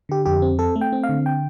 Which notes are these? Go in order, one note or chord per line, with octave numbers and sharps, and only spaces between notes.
D3 G4
F2 G4
C4
C4 A4
A3
G5
C4
F5
D3
G5